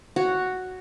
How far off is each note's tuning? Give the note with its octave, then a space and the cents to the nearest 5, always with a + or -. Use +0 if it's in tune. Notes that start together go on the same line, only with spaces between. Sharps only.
F#4 +0 C#5 +0